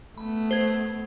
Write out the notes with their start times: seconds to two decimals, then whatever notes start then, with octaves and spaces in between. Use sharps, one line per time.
0.18 A3 B3 B5
0.51 C5 G#6